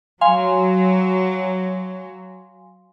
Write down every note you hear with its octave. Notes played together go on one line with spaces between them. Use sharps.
F#3 F5 G#5 C6